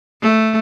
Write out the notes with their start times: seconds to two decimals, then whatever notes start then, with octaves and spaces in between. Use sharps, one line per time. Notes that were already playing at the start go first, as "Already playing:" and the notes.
0.22 A3